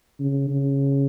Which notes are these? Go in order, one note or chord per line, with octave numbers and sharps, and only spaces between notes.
C#3
C#3